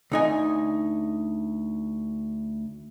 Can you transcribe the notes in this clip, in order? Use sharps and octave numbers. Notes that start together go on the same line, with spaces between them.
D2 D#4 G#5